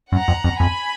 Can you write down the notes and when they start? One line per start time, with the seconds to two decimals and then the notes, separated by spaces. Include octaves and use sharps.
0.11 F#2 F#5 A#5
0.28 F2
0.44 F2
0.60 F2 G#5 B5